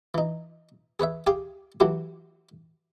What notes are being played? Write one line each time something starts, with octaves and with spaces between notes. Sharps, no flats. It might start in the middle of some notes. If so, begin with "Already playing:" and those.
E3 D#4
G#4 B4 C#5 E5
G4 G#4 F5 G5 C6
E3 F#3 A3 E4 F#4 G4